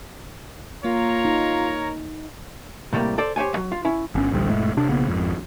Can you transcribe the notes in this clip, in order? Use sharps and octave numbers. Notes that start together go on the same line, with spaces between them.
A#3 F4 A#4 C#5 A#5
D#4
A2 C3 G3 G#3 A#3
A4 C5 D5
G4 C5 C#5 G#5
E2 F#3
F4
C#4 E4
G1 C#4
A1 D2 G3
F1 A2 G#3 A3
C3 D4
B1 C#3 A#3 B3
G#1 F2